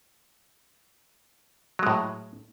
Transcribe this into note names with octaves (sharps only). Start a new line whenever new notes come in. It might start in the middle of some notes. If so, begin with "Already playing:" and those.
A2 F#3 G#3